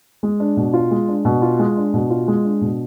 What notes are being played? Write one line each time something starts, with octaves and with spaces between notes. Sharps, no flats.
G#3
D4
B2
F4
G#3
D4
B2
F4
G#3
D4
B2
F4
G#3
D4
B2